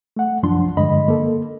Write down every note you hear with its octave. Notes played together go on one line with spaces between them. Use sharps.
A3 F#5
C2 F#2 F3 D4 C6
G2 D3 G#3 D#5 B5
A#3 A4